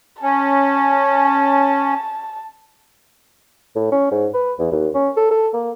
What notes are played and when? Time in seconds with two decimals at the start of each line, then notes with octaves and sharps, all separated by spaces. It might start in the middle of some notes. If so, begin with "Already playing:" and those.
0.22 C#4 A5
3.76 A2
3.92 C#4
4.11 G#2
4.34 B4
4.59 E2
4.72 D#2
4.94 C#4
5.17 A4
5.31 A4
5.53 A#3